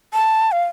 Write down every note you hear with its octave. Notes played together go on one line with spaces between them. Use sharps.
A5
F5